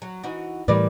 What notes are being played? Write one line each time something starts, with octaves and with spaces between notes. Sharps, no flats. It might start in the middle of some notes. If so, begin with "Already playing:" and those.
F#3
E3 D#4 F#4
A2 E3 G3 A#4 B4 D5